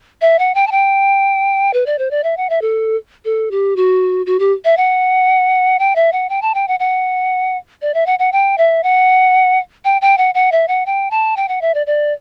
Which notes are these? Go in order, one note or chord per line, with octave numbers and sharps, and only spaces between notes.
E5
F#5
G5
A5
G5
B4
D5
C5
D5
E5
F#5
E5
A4
A4
G4
F#4
F#4
G4
E5
F#5
G5
E5
F#5
G5
A5
G5
F#5
F#5
D5
E5
F#5
F#5
G5
E5
F#5
G5
G5
F#5
F#5
E5
F#5
G5
A5
G5
F#5
E5
D5
D5